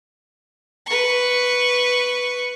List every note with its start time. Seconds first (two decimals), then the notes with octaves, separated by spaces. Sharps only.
0.86 B4 C#6